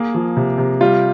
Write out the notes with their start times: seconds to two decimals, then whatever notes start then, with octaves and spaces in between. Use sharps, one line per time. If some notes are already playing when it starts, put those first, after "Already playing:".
Already playing: A#3 G#4
0.14 F3
0.37 C3
0.58 C3
0.81 G3 F4